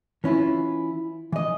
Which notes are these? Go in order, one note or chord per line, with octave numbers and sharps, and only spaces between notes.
E3 C#4 E4 F4
E3 D#5